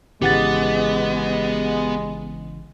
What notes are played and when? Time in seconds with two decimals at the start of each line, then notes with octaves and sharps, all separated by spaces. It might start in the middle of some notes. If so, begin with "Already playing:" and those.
0.22 G#1 C#3 E3 G#3 B3 G4 F#5 A6